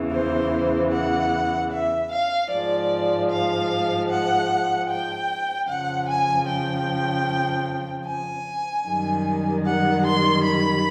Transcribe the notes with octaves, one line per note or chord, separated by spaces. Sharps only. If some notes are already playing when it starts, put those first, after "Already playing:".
Already playing: E2 C#3 E3
C5
F#5
E5
F5
G#2 F3 G#3 D5
F5
F#5
G5
F2 C#3 F3 F#5
G#5
G5
G#5
F#2 D#3 G3
F#5
C6
B5